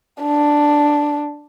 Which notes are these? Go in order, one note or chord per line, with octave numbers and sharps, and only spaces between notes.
D4